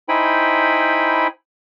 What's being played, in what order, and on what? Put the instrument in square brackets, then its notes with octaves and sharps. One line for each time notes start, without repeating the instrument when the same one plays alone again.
[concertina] D#4 E4 C5 G5 G#5 B5